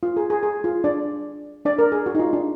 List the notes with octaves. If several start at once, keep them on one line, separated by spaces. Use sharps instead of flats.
F4
G#4
G#4
G#4
F4
D4 D5
D4 D5
A#4
G#4
F#4
D#4
F4
D4